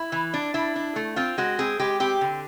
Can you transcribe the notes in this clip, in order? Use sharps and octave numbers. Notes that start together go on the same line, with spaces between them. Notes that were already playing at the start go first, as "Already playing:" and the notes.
Already playing: E4
E3
D4
D4 E4
D4
A3
C4 F4
G#3 F#4
C4 G#4
G#3 G4
C4 G4
D3